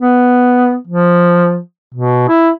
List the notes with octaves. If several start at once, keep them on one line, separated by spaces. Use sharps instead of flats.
B3
F3
B2
E4